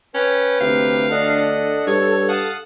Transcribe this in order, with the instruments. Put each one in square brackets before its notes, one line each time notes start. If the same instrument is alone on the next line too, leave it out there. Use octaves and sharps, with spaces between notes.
[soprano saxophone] C#4 [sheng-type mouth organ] B4 G5
[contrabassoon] D2 [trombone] C3 [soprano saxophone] F5
[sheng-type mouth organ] D4 D#5 F#5 [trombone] A4
[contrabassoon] G2 [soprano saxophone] C#5
[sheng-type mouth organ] F5 A5 D#6 [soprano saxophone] F#5